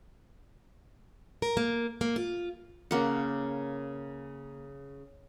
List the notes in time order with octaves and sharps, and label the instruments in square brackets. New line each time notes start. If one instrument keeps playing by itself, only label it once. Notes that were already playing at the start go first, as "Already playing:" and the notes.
[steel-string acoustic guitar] A#4
A#3
A#3
F4
[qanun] C#3 A#3 F#5